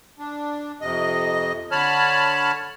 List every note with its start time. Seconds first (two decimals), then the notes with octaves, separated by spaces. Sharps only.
0.19 D4
0.81 F2 C3 D#5
1.71 D3 C#5 A5 B5 F6